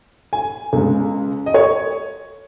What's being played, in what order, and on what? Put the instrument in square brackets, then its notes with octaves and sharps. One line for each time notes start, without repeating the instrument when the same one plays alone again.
[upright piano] G#5
C#2 C#3 G#3
D#5
C#5